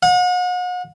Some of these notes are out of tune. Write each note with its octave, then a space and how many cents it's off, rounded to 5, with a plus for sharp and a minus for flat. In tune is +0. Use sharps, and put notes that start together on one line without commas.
F#5 -40